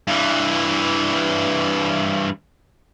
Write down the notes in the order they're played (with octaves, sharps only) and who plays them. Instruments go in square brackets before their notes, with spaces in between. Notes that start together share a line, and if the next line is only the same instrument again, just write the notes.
[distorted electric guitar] G2 E3